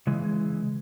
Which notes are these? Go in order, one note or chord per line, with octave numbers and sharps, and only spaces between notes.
C#3 E3 G#3